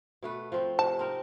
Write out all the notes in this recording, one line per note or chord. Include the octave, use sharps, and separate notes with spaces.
B2 A3 B4
F3 C4
C3 A5
C4 D#4 A#4